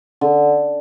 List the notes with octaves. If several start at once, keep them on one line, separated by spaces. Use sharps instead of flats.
D3